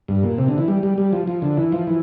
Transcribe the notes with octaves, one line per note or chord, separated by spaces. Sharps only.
G2
A#2
C3
D3
E3
G3
G3
G3
F3
F3
D3
E3
F3
E3